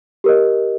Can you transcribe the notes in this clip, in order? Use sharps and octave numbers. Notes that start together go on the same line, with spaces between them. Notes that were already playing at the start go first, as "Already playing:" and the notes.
G4 A#4 D#5